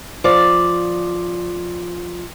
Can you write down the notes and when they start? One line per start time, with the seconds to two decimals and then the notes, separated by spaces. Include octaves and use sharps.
0.24 F3 D5